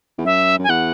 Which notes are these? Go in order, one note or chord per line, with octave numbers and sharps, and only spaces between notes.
E2
F#2 E5
F#2 G#5
E2 F#5